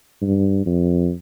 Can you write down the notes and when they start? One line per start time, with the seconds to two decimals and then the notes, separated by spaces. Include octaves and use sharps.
0.22 G2
0.66 F2